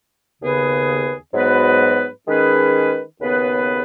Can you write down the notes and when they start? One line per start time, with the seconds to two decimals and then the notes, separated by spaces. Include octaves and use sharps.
0.41 D#2 C#3 B3 G#4 B4
1.34 G#2 F#3 B3 F#4 B4
2.28 D#3 G#3 C#4 G#4 B4
3.20 D#2 C#3 B3 G#4 B4